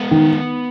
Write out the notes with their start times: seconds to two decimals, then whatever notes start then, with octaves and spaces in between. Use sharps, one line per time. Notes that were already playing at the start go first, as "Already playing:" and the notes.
Already playing: G#3 B3
0.11 D#3